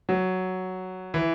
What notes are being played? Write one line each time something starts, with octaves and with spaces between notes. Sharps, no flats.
F#3
E3